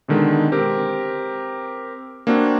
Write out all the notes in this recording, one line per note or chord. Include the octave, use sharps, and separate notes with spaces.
B2 D3 D#3 G#3
C4 G4 A#4
A#3 C4 D4 F#4